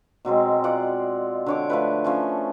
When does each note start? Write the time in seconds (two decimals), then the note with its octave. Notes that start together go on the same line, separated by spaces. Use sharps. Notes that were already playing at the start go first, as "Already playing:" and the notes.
0.25 B2 F#3 G#3 C4
0.64 F4 D5 F#5
1.46 D3 C#5 D6
1.70 F3 A3 B4
2.04 F3 C#4 A5